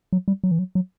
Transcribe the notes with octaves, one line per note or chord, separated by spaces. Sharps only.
F#3
G3
F#3
E3
F#3
F#3